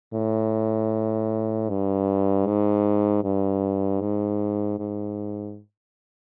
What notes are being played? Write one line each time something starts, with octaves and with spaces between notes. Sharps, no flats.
A2
G2
G#2
G2
G#2
G#2